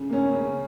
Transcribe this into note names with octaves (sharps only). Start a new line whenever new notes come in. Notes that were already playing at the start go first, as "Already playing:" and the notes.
Already playing: C#3
A#3 C#4
C#3